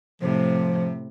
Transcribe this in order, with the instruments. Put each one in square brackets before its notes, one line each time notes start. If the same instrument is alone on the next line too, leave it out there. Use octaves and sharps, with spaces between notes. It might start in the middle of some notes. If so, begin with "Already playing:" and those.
[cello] A2 C3 [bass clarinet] F3